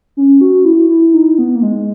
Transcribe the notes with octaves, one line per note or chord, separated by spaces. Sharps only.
C#4
F#4
E4
E4
D#4
B3
A#3
G#3